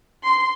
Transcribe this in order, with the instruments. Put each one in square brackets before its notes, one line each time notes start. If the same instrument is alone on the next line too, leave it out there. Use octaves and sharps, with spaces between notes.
[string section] C6